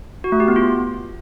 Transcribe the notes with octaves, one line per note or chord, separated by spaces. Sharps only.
F#4
A3
G4
B3
F4